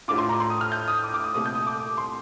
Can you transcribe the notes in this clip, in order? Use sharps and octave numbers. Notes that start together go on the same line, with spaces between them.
A2 A3 D4 F4 D6
C6
A#5
C6
D#6
F6
G6
D#6
D6
D6
D#6
C2 A#2 A3 D#6
G6
D#6
D6
C6